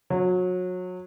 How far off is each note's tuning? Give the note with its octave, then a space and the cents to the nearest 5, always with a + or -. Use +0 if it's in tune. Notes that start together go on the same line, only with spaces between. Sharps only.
F#3 -25